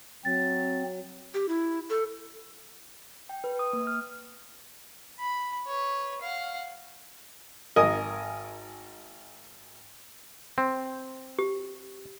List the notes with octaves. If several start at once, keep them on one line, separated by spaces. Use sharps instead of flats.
F#3 C4 A6
G4
E4
A4
G5
B4
D#6
A#3
F6
B5
B4 C#5
F5 F#5
G#1 A#4 D#5 G#5 D#6
C4
G4